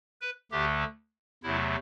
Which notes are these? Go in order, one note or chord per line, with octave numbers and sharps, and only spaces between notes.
B4
D2 D3 A3 G4
E2 C3 F#3 A3 E4